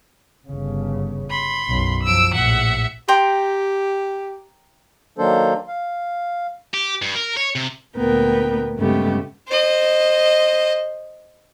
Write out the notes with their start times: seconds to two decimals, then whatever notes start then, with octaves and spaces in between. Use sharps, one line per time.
0.48 G1 C#3
1.30 B5 C6
1.68 B1 F#2
2.03 F#2 F3 E6 D7
2.34 A#1 A2 E5 F#5
3.08 G4 G5 A#5 C6
5.18 D#3 F#3 A#3 D4 A4 C5
5.68 F5
6.74 G4
7.02 G2
7.16 A#4
7.37 C#5
7.56 C3
7.97 D2 A#2 B3 A#4 G5
8.77 G2 C#3 G#3 A3 B3 G4
9.48 C5 D#5